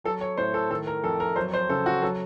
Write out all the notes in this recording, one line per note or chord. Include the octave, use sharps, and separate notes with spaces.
F#3 A4
C#5
A2 C5
A4
D#3 A4
A#4
F2 A4
A#4
F#3 C5
C5
C#3 A4
F#4
F#3 A4